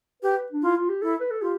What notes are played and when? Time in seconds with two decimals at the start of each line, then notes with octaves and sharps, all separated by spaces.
0.22 G4 B4
0.52 D4
0.62 E4 F4
0.77 F4
0.89 G4
1.02 E4 A4
1.21 B4
1.30 A4
1.42 F4 G4